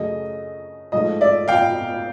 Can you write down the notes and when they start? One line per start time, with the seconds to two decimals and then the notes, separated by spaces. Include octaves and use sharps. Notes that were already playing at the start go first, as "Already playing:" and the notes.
Already playing: F#2 C#3 F#3 A3 D#5
0.92 G#2 F3 A3 D#5
1.21 D5 E5
1.48 F5 G5